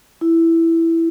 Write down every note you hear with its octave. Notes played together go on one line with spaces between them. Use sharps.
E4